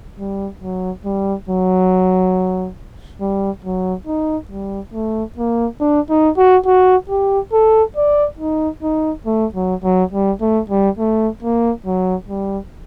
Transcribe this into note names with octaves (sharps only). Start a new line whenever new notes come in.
G3
F#3
G3
F#3
G3
F#3
D#4
G3
A3
A#3
D4
D#4
F#4
F#4
G4
A4
D5
D#4
D#4
A3
F#3
F#3
G3
A3
G3
A3
A#3
F#3
G3